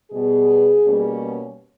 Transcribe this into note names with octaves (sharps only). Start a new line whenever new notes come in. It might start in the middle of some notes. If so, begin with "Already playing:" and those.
B2 G3 B3 G#4
B2 G3 A#3 C#4